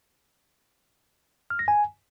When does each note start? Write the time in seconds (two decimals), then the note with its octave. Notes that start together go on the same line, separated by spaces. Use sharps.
1.50 F6
1.59 A#6
1.68 G#5